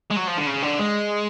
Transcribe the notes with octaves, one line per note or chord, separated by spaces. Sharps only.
G#3
F#3
F3
D3
C#3
D3
G#3